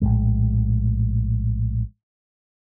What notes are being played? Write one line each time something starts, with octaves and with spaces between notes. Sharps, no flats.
A#1 F2 A2 G#3